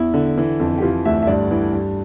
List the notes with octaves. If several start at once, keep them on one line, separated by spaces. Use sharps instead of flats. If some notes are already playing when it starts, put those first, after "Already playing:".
Already playing: E2 E4
D3
E3
F2
G4
E3 F4
D2 E5
E5
G2 D5
E3
G2